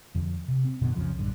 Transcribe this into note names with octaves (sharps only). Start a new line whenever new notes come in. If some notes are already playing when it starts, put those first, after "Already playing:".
F2 D3 F3
C3
C4
F#2 B2 D3 B3
C2 F2 C#3 F3
A#1 G2 D3